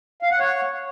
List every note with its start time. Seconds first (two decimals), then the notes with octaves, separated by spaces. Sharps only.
0.23 F5
0.31 F#5
0.40 C#5